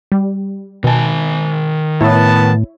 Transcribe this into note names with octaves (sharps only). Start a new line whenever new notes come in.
G3
B2 D#3 G#5 A5
A2 B3 E4 C#5 E5 A5